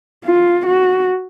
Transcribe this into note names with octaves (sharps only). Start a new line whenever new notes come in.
F4
F#4